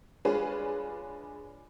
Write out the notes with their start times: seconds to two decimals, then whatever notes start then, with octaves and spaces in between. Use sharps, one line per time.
0.25 G#3 D4 F4 G#4 B4 C#5